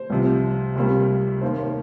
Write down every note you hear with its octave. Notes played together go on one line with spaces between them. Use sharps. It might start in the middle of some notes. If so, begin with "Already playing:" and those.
Already playing: C5
C2 C3 F3
C#2 C3 G3 A#3
D#2 D#3 A#3 C5
A#4 C#5